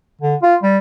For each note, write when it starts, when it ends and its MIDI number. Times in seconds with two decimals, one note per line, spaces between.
0.21 0.35 50
0.42 0.55 65
0.63 0.78 55